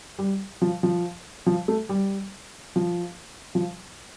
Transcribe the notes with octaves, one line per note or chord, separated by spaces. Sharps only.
G3
F3
F3
F3
A3
G3
F3
F3